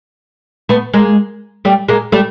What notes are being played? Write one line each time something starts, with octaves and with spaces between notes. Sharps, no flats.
A3 B3
G#3 A#3
G3 A3
G#3 A#3
G3 A3